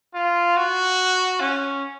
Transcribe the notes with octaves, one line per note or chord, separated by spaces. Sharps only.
F4
F#4
C#4